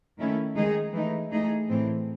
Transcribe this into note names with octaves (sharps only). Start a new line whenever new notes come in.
D#3 A3 C#4 E4
D#3 G#3 D#4 G#4
E3 A3 D#4
E3 A3 D#4 G#4
A2 E3 C4